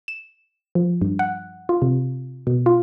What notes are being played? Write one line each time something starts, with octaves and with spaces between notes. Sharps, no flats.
E7
F3
G2
F#5
F4
C3
B2
F4